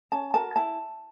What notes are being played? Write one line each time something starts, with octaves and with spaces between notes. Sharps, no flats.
C#4 A5
F#4 A#4 A5
E4 A5